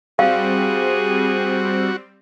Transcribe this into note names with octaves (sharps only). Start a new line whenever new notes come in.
G3 C4 F#4 G#4 F5